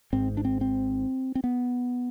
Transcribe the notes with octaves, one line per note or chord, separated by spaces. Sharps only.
G#1 G#2 C4
D4
C4
C4
C4
B3